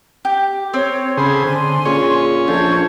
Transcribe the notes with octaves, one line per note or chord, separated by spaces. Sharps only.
G4
C4 C#5
C#3 G#4 A4 C5 B5
D3 G#5 C6
A#2 C#4 G#4 C#5
A#1 F4 A4 G6 G#6